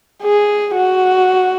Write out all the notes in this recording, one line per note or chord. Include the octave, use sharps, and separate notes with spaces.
G#4
F#4